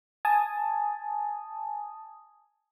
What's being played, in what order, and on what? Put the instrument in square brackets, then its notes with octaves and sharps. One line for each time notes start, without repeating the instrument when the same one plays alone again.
[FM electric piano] G#5 A5 D#6